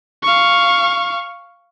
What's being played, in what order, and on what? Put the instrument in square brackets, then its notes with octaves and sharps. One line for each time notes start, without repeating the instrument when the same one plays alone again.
[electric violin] F5 C#6